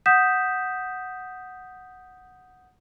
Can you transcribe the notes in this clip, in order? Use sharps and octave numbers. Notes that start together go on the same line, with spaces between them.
F#5 D#6 G6 B6 E7